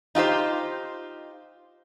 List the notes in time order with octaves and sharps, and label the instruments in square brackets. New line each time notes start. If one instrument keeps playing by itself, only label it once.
[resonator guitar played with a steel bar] D#4 F4 G4 C5